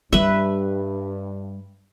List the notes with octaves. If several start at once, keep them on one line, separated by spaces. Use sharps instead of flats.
G2 G3 B4 E5